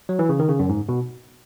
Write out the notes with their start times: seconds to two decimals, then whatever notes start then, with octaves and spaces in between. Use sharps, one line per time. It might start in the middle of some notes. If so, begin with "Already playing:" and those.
0.09 F#3
0.19 E3
0.29 C#3
0.39 D#3
0.49 C#3
0.59 F#2
0.69 G#2
0.89 B2